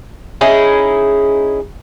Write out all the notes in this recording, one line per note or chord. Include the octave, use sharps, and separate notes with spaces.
C#4 D#4 E4 G#4